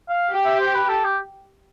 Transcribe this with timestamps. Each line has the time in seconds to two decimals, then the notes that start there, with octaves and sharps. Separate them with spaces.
0.09 F5
0.31 G4
0.45 E5
0.60 C5
0.74 B4
0.89 A4
1.04 G4